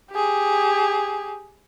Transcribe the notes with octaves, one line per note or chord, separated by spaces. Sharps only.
G4 G#4